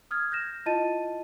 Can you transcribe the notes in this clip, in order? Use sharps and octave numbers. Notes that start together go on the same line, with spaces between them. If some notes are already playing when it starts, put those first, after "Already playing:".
D#6 F6 G#6
F6 G6 A#6 E7
E4 F4 D#5 A5 A6 D#7